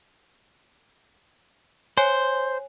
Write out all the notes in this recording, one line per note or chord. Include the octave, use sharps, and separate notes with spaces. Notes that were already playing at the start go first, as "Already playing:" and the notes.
C5 C#5 G#5 C7